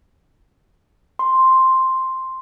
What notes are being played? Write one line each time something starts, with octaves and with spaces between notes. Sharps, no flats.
C6